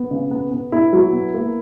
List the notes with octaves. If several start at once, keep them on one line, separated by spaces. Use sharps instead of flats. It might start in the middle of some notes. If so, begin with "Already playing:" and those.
Already playing: B3
C#3
B3
B3
B3 E4
F#3
B3
A#3